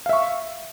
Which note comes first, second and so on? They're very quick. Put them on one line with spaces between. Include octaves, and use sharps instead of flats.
F5 E5 C#6